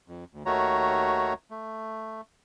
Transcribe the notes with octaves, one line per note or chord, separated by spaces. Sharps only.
F2
D2
D#2 D#3 A3 F#4 C#5 A#5
A3